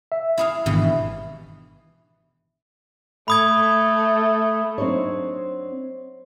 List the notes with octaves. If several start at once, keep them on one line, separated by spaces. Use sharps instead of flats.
E5
E4 G#4 F5
G#1 G2 B2 E3
A3 B5 D#6 G#6
F#3 C4 D4 D#4 C#5